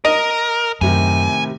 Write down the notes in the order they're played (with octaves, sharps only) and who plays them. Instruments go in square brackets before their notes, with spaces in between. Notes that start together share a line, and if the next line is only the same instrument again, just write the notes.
[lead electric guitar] A#4 [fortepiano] D#5
[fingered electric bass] F#2 [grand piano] A2 C3 D#3 [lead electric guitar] G#5